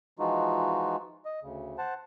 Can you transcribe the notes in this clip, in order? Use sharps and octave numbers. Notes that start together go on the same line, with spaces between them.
E3 F3 G#3 D#4 F4 F#4
D#5
D2 C#3
C5 F#5 A5